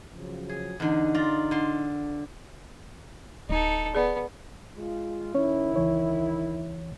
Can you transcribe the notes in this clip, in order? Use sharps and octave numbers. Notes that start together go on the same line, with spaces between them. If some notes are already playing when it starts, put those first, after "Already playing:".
C#3 F3 F#3
G#4
E2 D3 D#4
F4 D5 A#5
D3 C6
D1 D#4 A4
B3 G#4 D5
G#3 F4
D#3 C#4 E4 C#5
C#2 E3 C#5